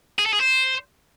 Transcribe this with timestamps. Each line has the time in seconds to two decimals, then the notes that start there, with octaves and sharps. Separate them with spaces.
0.18 G#4
0.26 A4
0.33 G#4
0.40 C5